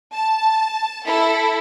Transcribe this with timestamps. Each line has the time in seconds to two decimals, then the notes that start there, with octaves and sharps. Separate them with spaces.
0.14 A5
1.06 E4 A4